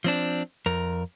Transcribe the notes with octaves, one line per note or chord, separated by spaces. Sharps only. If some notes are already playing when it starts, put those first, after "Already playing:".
F3 C4 D4
F2 A#4